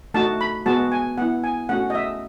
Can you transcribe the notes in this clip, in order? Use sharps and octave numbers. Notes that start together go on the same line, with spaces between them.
A3 D#4 F#4 A5
B5
G#3 B3 F#4 A5
G#5
B3 E4 F#5
G#5
A3 C#4 F#4 F#5
D#5
E5